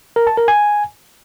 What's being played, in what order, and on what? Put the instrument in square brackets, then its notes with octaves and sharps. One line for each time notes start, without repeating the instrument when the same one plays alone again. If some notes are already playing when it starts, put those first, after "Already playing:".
[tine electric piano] A#4
A5
A#4
G#5